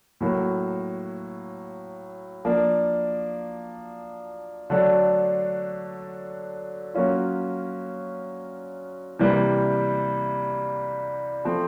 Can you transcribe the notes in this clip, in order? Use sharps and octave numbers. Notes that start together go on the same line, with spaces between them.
A2 F#3 A#3
F3 A#3 D4
D3 F#3 A3 D4
F#3 A#3 C#4 F4
C3 E3 G3 A#3
F3 A3 C4